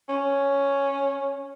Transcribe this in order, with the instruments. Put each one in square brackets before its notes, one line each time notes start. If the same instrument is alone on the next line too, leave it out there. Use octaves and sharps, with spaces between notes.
[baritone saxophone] C#4